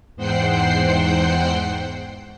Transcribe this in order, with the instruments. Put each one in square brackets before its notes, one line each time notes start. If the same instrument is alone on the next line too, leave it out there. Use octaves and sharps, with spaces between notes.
[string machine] E2 G#2 C5 F#5 G5 C7